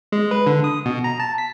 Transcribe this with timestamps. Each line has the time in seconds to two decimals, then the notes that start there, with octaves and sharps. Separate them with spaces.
0.12 G#3
0.31 B4
0.47 D3
0.64 D#6
0.85 B2
1.04 A#5
1.20 A5
1.38 B6